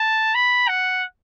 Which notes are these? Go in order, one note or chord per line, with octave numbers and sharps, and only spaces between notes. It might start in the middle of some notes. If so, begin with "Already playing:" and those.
Already playing: A5
B5
F#5